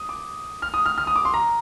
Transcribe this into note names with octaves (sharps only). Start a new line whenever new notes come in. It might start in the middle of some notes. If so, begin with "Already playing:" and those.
Already playing: D#6
D6
F6
D#6
F6
F6
D#6
D6
C6
A#5